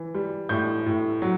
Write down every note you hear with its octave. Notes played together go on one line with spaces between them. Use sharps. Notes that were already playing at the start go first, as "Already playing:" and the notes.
Already playing: E3
G3
A2 G6
A2
F#3